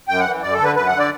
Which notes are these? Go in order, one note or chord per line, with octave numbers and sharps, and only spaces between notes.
F#2 G5
F#5
E3
F#2 D5
A4
D3
B4
F#2 B4
F#5
D3
D5